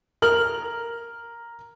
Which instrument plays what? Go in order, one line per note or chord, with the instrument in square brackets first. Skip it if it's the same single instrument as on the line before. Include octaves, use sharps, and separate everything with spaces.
[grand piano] A#4 F6 F#7